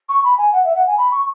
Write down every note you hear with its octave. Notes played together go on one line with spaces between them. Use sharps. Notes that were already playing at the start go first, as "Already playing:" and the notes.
C#6
B5
G#5
F#5
E5
F#5
G#5
B5
C#6